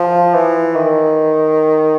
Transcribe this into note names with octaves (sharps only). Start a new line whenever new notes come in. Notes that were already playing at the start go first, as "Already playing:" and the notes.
Already playing: F3
E3
D#3